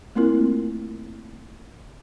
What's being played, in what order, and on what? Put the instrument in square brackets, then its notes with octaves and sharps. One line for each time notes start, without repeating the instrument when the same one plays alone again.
[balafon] A3 A#3 C4 E4 F4 A#4